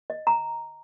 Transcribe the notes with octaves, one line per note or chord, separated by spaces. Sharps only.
D#5
A#5